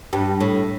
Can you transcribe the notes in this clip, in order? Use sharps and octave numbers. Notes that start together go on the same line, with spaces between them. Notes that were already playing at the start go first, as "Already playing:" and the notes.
G2
A2